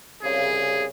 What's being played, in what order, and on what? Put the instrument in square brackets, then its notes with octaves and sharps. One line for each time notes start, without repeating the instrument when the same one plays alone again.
[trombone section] C2 C#3 [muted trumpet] G#4